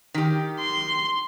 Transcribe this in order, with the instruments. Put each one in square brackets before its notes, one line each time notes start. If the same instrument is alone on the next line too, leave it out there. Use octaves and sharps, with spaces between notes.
[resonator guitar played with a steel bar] D#3 G4
[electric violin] C6